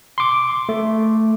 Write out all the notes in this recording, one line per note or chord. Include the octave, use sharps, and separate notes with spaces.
C6 D6
A3